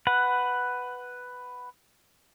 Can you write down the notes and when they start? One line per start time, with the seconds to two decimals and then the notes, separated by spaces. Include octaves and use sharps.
0.07 B4 F#5